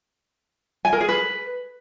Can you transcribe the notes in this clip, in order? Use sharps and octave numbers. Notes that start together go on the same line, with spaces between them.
G#5
A#4
G#4
B4